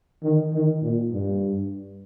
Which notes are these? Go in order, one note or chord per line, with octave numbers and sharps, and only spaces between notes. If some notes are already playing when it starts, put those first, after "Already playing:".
D#3
D#3
A#2
G2